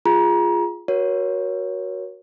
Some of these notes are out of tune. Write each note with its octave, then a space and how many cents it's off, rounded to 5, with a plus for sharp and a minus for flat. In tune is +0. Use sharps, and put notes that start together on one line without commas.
F4 +0 G#4 +0 A#5 +30
F#4 +0 A#4 +30 C#5 +0